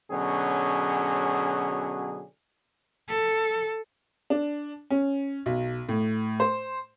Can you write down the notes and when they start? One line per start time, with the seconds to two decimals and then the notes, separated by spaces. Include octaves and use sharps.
0.12 B2 D3 F#3 C#4 G#4
3.09 A4
4.30 D4
4.90 C#4
5.46 B1
5.89 A2
6.40 C5